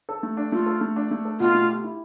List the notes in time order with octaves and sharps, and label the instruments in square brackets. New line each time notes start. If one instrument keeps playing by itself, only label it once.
[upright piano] A4
A3
D4
[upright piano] A3 [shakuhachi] F4
[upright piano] A4
A3
D4
A3
A4
[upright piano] B2 [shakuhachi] F4
[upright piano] A3
G4
E4